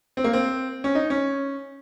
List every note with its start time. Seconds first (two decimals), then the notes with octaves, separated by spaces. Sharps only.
0.17 C4
0.24 A#3
0.33 C4
0.84 C#4
0.95 D#4
1.10 C#4